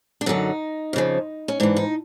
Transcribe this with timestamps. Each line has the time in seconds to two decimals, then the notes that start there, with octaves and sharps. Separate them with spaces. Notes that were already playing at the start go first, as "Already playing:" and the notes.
0.21 D4
0.26 F#2 D3 F#3 D#4
0.93 F2 C#3 F3
1.48 C#4
1.60 G#2 E3 D4
1.76 D#4